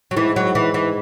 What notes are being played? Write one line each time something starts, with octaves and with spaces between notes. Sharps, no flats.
F#3
G#2 E3
F#3
E3
E3